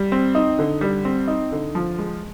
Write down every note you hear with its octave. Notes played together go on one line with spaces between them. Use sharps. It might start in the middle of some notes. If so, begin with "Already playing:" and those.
Already playing: G3
C4
D#4
D3
G3
C4
D#4
D3
F3
G#3